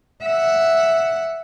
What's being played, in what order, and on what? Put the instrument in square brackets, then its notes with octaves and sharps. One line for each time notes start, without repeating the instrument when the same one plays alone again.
[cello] E5 F#5